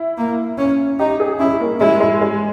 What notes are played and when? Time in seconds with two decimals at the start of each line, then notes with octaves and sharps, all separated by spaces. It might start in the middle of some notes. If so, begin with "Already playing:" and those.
Already playing: E4
0.17 A#3
0.58 C#4
0.99 D#4 G4
1.20 G#4
1.39 C#4 E4
1.60 A#3
1.80 G#3 E4
2.00 G#3
2.21 G#3